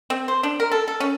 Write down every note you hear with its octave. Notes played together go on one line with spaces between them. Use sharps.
C4
C5
D4
A#4
A4
A4
C#4